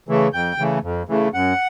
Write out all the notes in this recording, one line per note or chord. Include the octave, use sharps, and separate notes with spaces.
C#3 E3 A3
F2 G5
C#3 E3 A3
F2
C#3 E3 A3
F#2 F#5